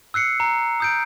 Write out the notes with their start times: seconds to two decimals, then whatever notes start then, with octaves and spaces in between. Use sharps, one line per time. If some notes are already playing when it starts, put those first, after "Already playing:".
0.14 E6 F#6 C7 C#7
0.40 A#5
0.80 D#6 G6 D7